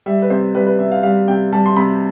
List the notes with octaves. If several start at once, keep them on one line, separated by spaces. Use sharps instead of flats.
G3 E5
B4
C3 C5
G3 B4
B4
C3 E5
F5
G3 F5
C3 G5
G3 A5
C6
C3 B5